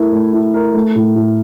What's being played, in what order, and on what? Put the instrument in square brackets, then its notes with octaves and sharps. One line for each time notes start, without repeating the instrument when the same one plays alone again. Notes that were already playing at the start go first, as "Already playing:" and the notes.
Already playing: [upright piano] A3 E4 A#4
A3
E4
A#4
A3
A2
A2